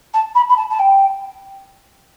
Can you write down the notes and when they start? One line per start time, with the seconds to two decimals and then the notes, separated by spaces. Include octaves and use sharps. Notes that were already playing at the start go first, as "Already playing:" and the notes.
0.13 A5
0.34 B5
0.48 B5
0.56 A5
0.70 A5
0.79 G5